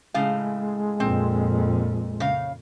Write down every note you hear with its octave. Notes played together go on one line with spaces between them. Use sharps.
A2 C#3 G#3 F5
F2 A#2 C4
C#3 F5